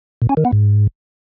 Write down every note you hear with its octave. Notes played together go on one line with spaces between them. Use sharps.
A#2
C#4
D#3
B3
G#2